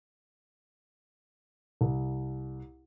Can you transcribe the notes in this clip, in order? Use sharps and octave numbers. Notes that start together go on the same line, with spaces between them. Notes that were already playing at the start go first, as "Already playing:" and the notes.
C2